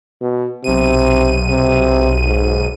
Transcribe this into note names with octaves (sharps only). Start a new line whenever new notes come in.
B2
B1 C3 D#7
C3
G#2